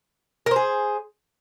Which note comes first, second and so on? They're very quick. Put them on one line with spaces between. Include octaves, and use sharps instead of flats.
A#4 C5 G#4